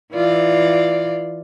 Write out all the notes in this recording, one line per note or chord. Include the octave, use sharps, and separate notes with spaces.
E3 F4 D5